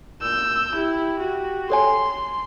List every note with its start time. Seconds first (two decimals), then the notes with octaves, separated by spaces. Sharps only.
0.22 A#2 E6 G6
0.75 E4 G4
1.19 F#4
1.70 A4 C#5 G#5 C6